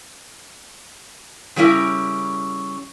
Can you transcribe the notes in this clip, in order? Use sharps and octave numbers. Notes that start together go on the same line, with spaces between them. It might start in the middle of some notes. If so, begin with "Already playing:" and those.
C#3 G3 C#4 E4 A#4